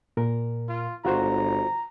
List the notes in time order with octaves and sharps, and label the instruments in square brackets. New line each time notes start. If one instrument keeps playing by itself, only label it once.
[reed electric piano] A#2 A#4
[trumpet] F4
[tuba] G1 [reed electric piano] F4 F#4 C5 [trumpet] A#5